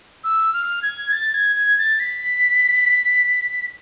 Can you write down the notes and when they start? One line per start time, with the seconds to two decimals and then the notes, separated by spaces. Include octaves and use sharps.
0.24 E6
0.53 F6
0.82 G#6
1.12 A6
1.34 G#6
1.56 G#6
1.78 A6
2.00 B6